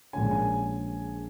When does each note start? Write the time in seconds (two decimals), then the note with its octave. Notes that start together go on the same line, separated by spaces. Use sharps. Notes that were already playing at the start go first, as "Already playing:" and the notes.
0.13 A#1 A#2 G#3 C#4 G#5
0.31 G#5